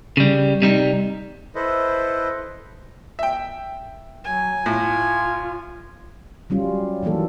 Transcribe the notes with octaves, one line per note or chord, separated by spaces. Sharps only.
C#3 G3
C3 G3 D#4
E4 A4 B4 C5 D#5
E5 G5
F#3 G#5
A2 F4
F#3 G3 C#4 F4
D#3 E3 F#3 A#3 A4